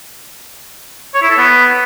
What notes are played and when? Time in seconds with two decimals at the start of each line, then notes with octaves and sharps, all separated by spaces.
1.14 C#5
1.22 E4
1.30 A4
1.38 B3